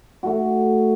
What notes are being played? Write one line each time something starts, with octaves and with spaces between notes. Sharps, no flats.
A3 F#4